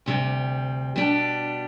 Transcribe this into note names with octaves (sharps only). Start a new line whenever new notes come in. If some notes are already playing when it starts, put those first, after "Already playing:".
D2 C3 G3
B2 G3 D4 G4